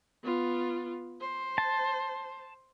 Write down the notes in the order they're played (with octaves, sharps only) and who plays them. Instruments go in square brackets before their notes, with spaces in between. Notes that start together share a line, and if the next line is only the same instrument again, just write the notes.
[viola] B3 F4
C5
[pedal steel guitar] A5